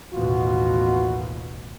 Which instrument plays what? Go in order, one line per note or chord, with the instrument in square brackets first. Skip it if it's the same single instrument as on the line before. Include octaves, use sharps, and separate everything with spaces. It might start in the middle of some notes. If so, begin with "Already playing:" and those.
[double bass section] A1 D#2 B2 [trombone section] F4 F#4